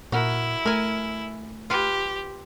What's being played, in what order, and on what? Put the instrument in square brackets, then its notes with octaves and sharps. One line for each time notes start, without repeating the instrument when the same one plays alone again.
[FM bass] A#2 [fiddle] E4 [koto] F#4 A#4
[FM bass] A3 [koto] A#4 G#5
[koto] F4 B4 [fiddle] G4